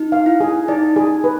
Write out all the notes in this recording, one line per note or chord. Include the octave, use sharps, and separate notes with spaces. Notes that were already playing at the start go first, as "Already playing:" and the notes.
Already playing: D#4
F5
E4
G#4
D#4 D5
G#4
B4